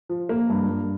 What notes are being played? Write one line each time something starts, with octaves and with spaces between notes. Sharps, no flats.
F3
A#3
G2
G2